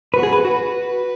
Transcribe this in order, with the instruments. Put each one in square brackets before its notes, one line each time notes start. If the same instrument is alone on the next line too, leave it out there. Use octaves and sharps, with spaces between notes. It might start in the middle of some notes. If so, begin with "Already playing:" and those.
[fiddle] F#4 [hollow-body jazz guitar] B4
[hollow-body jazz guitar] G#4
B4
[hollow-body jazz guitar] F#4 [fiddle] B4